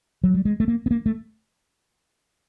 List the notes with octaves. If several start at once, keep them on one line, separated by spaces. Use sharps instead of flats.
F#3
G3
G#3
A3
A#3
B3
A#3
A3